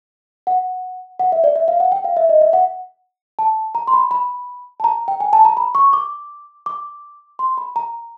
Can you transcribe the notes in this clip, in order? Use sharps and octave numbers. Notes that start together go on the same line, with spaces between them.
F#5
F#5
E5
D5
E5
F5
F#5
G5
F5
E5
D#5
E5
F#5
A5
A#5
C6
B5
B5
A5
A#5
G5
G#5
A5
A#5
B5
C#6
D6
D6
C6
B5
A#5